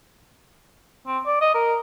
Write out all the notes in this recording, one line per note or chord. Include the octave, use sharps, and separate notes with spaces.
C4
D5
D#5
A#4